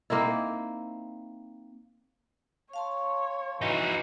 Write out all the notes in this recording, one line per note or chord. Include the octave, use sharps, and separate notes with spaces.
A#3 C4 D#4 E4
C#5 F5 A5 C6
E3 D#4 F#4